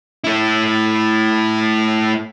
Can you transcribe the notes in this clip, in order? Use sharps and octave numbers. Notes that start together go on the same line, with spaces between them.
A3 E4